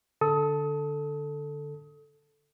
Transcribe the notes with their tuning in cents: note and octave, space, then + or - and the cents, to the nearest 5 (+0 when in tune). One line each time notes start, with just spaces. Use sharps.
D3 +0 A4 +0 D#6 +30